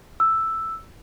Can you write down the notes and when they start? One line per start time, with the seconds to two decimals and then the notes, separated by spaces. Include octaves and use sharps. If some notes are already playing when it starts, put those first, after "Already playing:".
0.20 E6